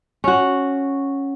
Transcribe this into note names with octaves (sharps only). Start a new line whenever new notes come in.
C#4 F#4